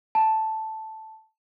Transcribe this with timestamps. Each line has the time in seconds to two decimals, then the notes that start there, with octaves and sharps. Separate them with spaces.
0.15 A5